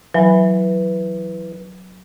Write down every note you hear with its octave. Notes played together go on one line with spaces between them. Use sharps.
E3 F#3